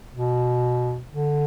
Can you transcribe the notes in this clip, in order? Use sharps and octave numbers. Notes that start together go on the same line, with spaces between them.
B2
D3